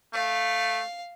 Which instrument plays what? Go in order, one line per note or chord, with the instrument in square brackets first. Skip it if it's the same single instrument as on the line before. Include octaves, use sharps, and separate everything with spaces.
[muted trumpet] A3 [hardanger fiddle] F5